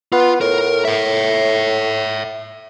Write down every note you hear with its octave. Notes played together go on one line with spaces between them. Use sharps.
B3 F4
A2 A#4
C#5 E5